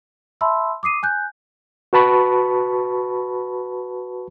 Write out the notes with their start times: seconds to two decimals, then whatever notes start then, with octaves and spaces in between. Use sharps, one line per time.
0.41 E5 A5 B5 C6 E6
0.83 D6 D#6 C7 D#7
1.03 G#5 F#6 G6
1.93 F#4 B4 A5 B5 C#6